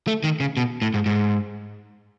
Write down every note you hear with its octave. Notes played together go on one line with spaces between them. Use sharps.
A3
D#3
C#3
B2
A2
G#2
G#2